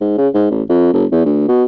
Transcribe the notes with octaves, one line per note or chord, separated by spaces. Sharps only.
G#2
C#3
G#2
A1
F2
F#1
E2
D2
B2